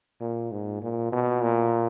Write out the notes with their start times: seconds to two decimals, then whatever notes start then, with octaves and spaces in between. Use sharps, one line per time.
0.20 A#2
0.51 G#2
0.82 A#2
1.12 B2
1.43 A#2